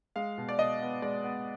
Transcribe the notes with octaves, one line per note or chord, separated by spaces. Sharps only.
G#3 F5
B2
D5
B2 D#5
B3
G#3 D5
B3